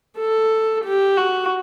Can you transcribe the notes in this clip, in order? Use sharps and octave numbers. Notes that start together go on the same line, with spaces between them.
A4
G4
F#4